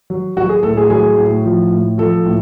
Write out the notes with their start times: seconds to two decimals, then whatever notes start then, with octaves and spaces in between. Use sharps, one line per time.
0.10 F#3
0.37 F#3 F#4
0.49 G#4
0.63 A2 A4
0.77 G#4
0.90 F#3 G#4
1.17 A2
1.45 F3
1.71 A2
1.98 F3 A4
2.25 A2